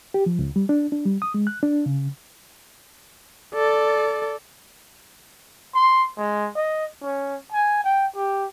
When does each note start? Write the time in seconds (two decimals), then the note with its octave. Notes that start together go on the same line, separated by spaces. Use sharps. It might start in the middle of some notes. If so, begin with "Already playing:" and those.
0.14 G4
0.26 F3
0.39 C#2
0.56 G3
0.69 D4
0.92 D4
1.05 G3
1.22 D#6
1.34 G#3
1.47 F#6
1.63 D4
1.86 C#3
3.54 A4 D5
5.75 C6
6.17 G#3
6.56 D#5
7.02 C#4
7.52 G#5
7.84 G5
8.16 G4